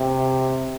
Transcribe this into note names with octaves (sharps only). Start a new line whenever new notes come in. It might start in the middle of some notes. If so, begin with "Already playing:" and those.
Already playing: C3